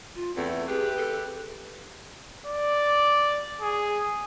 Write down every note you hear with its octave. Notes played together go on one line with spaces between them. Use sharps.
F4
E2 A3 C4
C4 G4 G#4 B4
A4
D5
G#4